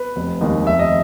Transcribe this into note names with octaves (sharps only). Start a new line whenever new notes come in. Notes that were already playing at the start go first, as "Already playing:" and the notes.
Already playing: B4
F1
D#2 D#3 G#3
F1 E5
D#5